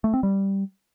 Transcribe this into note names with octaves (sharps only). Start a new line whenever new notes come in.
A3
C4
G3